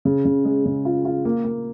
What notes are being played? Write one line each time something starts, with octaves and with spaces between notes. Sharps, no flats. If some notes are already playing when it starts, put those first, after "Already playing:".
C#3
C#3
G#3
C#3
F4
F4
A#3
A#3